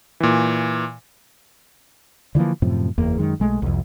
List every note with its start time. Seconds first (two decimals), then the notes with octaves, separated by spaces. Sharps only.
0.20 A#2 E3
2.35 D3 E3 F3 A#3
2.62 F#2 A2 C3 F3
2.98 F#1 E2 A#3
3.18 F#2 D#3 G#3
3.40 B1 G#3 A3
3.62 C2 F2